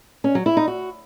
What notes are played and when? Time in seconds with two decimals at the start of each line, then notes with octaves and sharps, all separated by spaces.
0.24 C#4
0.35 F#3
0.46 E4
0.57 D#4
0.68 F#4